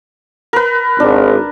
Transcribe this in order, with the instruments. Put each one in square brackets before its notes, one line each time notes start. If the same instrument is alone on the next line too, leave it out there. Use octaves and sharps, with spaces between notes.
[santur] A#4 B4
[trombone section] G#1 [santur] D4